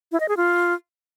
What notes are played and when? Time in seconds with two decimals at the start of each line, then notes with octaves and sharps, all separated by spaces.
0.12 E4
0.20 D#5
0.29 G#4
0.37 F4